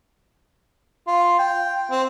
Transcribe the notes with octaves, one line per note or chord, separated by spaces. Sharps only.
F4
G5
C4